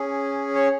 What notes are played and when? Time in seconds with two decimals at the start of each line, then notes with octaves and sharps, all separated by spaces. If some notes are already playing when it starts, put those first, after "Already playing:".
Already playing: C#4 G#4
0.55 C#5